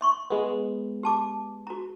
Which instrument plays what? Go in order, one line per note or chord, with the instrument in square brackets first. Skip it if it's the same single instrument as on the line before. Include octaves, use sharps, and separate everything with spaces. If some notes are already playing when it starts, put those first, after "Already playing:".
[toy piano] E5 C6 C#6
[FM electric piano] G#3 B3
[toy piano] G4 A5 D6
F#4 A#5